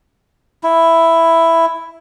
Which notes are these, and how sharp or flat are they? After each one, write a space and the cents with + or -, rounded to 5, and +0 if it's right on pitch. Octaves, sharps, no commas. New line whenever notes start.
E4 +5